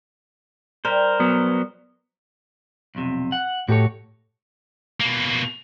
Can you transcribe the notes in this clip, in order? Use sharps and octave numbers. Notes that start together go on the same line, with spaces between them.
G3 A#4 C5
F#3 B3
B1 F2 C3
F#5
A2 F#4 G4 A4 C#5
B2 A#3